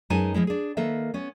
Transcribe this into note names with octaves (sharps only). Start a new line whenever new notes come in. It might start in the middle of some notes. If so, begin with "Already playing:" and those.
F#2 G#3 D#4 B4 G#5 A5
F3 F#3 G#3 E4
D4 G#4
D#3 A#3 A4 B4 E5
B3 C#4